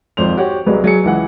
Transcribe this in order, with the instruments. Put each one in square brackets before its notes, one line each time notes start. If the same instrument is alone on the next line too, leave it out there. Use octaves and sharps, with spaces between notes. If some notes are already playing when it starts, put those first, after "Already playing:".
[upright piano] G#1 F2 C5 F7
F#4 G4 C#5 F#5
C2 F#3 G#3 B4
F#3 G#4 C#7
C#2 E3 F#5